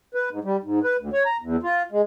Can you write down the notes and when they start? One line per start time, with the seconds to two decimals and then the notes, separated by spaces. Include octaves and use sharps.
0.15 B4
0.30 G#2
0.44 G3
0.64 G#2
0.84 B4
0.99 D2
1.13 C#5
1.26 A#5
1.41 E2
1.63 F4
1.92 G#3